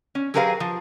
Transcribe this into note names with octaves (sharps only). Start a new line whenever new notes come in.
C#4
F#3 G4 G#4 A#4 B4 F5
F3